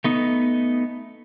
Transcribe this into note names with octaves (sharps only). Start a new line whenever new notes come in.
A3 B3 D#4